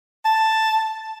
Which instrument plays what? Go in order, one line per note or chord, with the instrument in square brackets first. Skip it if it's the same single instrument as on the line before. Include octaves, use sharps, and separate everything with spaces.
[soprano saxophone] A5